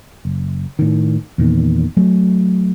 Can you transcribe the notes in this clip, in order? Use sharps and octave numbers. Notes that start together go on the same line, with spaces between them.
F#1
A2 D#3
E2 A#2 D#3
F#3 A3